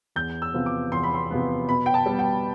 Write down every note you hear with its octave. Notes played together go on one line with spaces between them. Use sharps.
E2 G6
E6
C3 F3 B3
D6
E2 C6
B5
C6
C3 F3 B3
B2 B5
G5
A5
G3 B3
G5